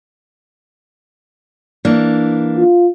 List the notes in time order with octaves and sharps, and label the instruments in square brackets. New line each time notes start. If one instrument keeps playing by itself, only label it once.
[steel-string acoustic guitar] E3 A#3 D4
[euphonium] F4